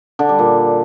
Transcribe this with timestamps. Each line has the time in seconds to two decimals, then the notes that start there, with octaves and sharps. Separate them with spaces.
0.19 D3
0.29 G3
0.39 A#2